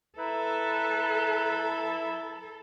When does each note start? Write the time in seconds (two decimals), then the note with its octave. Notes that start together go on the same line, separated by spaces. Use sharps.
0.18 E4 A4 B4 A#5